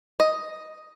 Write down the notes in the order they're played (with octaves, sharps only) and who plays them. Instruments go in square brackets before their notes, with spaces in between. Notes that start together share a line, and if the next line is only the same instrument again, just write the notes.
[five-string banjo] D#5